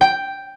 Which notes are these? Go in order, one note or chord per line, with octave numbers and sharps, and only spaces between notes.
G5